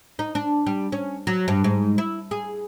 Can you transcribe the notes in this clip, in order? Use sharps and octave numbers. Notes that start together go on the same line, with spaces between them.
D#4
D4
G3
C#4
F#3
G2
G#2
E4
G#4